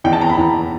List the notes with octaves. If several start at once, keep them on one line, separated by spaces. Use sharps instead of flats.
E2 G5
A5
E2 A#5
B5
E2